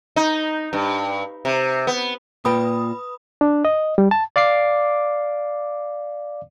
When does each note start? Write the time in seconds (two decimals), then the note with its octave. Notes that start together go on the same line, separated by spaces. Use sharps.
0.16 D#4
0.73 G2
1.45 C3
1.87 B3
2.45 A#2 F4 B4 G5 B5 D#6
3.41 D4
3.65 D#5
3.98 G3
4.11 A5
4.36 D5 F5 D6 C7